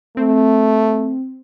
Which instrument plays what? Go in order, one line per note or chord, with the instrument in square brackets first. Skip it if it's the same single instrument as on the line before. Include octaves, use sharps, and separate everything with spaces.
[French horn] A3 [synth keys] C4